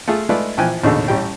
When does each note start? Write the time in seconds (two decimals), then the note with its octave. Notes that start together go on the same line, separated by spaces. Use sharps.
0.08 A3 F4 G#4
0.29 G#3 A3 D#4 F4 B4 D5
0.57 A#1 E3 F3 G5 G#5 F#6
0.84 A1 D#2 B2 D3 G#4 A4
1.08 A1 G3 C#4 G5